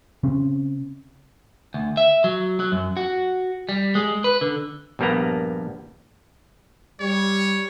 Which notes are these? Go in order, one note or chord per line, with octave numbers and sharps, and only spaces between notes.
C#3 C4 C#4
D2
E5
F#3
F#3
F#2
F#4
G3
G#3
B4
D3
A#1 G2 G3 A#3 B3 A#5
G3 C#5